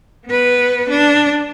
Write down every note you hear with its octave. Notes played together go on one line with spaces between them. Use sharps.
B3 B4
D4